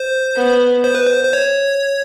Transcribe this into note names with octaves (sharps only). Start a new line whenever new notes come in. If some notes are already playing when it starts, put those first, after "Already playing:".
Already playing: C5
B3
C5
B4
C5
C5
C#5